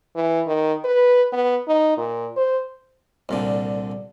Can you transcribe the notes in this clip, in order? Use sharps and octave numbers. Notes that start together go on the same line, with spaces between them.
E3
D#3
B4
B3
D#4
A#2
C5
C2 A#2 D3